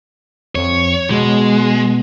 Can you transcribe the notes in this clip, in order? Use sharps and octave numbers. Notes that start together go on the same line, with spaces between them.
F2 C#5
B2 G#3